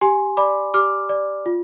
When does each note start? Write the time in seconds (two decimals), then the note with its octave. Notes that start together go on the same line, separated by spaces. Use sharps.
0.01 G4 G#5 C6
0.37 D5 B5 D6
0.74 G4 D6 F6
1.09 D5
1.46 F4